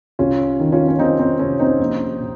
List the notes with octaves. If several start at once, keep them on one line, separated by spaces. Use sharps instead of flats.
C2 C#4 F4
D#3
C#4 F4
C#4
D#3 C4 D#4
C4
C3 C#4
C4 D#4
A#1
A#2